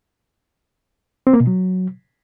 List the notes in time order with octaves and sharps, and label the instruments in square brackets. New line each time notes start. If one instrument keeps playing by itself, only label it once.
[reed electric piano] C4
A#3
B2
F#3